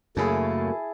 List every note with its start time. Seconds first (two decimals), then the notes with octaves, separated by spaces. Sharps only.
0.17 F#2 C#3 F#3 A3 A#3 E4 G#4 A5